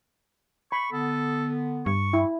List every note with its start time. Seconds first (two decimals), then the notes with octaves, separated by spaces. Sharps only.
0.72 B5 C#6
0.92 D3 B3 A4
1.86 G2 C#6
2.13 E4